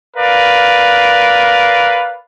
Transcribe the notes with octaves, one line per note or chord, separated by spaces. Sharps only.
A#4 B4 D5 F5